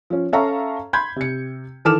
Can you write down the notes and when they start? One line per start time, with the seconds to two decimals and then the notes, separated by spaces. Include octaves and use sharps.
0.10 F3 C#4
0.33 C#4 A4 E5 F5 A#5 C#6
0.93 B5 C6 G6 G#6
1.16 C3 C#7
1.85 D#3 E3 A4 D6 F6 E7